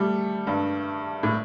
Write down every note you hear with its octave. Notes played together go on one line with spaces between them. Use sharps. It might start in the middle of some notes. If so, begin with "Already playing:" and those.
Already playing: G3 A3
G2
A2